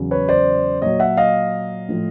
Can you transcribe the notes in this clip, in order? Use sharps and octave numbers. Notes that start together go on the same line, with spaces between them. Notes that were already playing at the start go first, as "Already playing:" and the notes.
Already playing: E2 C#3 F#3
B4 C#5
C5 D5
A#2 F#3 C#5 D#5
E5 F#5
D#5 F5
A2 F3